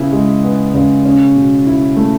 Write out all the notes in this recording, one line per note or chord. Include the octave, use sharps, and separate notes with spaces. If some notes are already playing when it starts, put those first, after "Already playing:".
Already playing: C#3 B3 E4
G#3
B3
C#3
C#4
B2
E4
A3